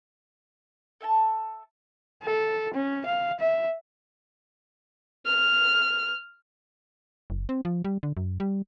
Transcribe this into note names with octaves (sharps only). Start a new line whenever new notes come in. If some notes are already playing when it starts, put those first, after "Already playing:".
A4 E5 G#5 A5
A4
C#4
F5
E5
F6
F#1
C4
F3
G3
D3
F#2
G3